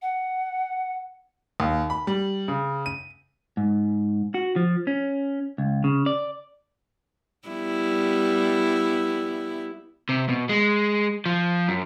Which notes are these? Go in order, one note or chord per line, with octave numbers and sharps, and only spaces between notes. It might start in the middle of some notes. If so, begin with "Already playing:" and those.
F#5
D#2
B5
G3
C#3
D#7
G#2
F#4
F3
C#4
C#2
C#3
D5
G3 B3 E4
C3
B2
G#3
F3
F#2